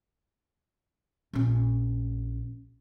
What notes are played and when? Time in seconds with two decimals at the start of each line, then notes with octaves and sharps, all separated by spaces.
1.33 A#1 C#4